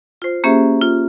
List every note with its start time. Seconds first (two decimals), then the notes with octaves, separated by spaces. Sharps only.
0.22 F4 C5
0.44 A#3 C#4 G4 G#4 C5 E5
0.82 F4